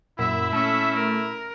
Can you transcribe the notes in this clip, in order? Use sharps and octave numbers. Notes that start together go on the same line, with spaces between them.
F#2 A#2 E4 E5
A3 C#4 E5
A#4